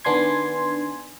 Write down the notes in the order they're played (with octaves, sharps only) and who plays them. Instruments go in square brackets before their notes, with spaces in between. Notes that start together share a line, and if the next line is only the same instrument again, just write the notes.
[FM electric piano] D#3 B3 D4 G#5 C6 G#6